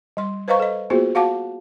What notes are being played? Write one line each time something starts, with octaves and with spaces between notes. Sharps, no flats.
G3 C6
B4 C5 D#5 F5 A#5 C#6
A4 D#5
A#3 B3 F4 F#4 G#4 C5
F#4 F5 F#5 A5 D6